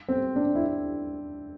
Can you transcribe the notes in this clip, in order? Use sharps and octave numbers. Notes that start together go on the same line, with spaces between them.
C4
D4
E4